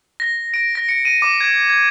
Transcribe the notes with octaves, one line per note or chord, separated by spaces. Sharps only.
A#6
D7
A#6
C#7
D#7
D6
G#6
G#6